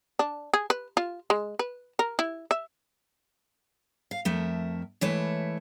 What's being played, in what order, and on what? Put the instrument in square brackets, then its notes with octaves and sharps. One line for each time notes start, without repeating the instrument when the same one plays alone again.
[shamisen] D4
G#4
B4
F4
G#3
B4
A#4
E4
E5
[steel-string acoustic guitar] F5
F2 A3 A#4 E5
E3 G#3 A3 E4 C#5